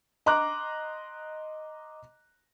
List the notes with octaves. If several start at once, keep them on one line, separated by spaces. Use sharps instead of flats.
D#5 A#5 C6 D6 F#6